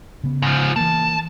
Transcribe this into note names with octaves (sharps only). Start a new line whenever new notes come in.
C#3 B3
G#2 F3
E3 A#3 A5